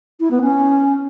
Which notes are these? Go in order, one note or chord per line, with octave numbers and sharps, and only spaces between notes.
E4
B3
C#4